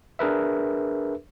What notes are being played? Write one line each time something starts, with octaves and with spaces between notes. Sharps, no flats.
D4 G#4 A#4 B4 E5